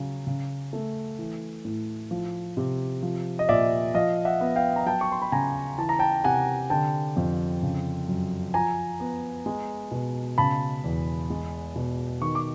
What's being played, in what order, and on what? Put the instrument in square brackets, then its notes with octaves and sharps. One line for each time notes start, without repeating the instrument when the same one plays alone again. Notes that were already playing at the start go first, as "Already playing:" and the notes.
Already playing: [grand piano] C#3 F#3
C#3
A3
E3
A2
F3
C3
F3
D#5
A#2 D5 E5
F3 D#5 F5
E5 F#5
B3
F5 G5
A#5
F#3 G5 A5
C#6
C6
B5
C#3 G#5 A#5
E3 A5
A#5
G5 A5
C3 F#5 G#5
D3 G5 A5
F2
C#3
F#2
F3 G#5 A#5
B3
G#3
B2
C#3 A5 B5
E2
G#3
B2
D#3 C#6
D6